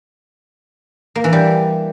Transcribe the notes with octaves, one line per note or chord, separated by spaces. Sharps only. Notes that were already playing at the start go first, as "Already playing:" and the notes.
A#3
E3
G3